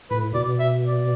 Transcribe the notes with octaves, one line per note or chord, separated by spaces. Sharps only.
A2 B4
B2 D5
E5
D5